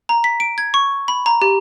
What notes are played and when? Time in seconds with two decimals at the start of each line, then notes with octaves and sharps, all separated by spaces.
0.09 A#5
0.24 B6
0.40 D7
0.58 G#6
0.74 C#6
1.08 B5
1.26 A#5
1.42 G4